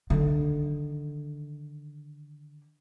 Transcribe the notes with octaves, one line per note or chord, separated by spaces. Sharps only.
D3 D#3